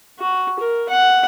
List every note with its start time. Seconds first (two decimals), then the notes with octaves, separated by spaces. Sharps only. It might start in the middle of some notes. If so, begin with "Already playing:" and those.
0.20 F#4
0.59 A#4
0.89 F#5